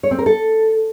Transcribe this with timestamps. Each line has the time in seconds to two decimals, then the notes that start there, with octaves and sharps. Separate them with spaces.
0.03 C#5
0.11 C4
0.19 A#4
0.26 A4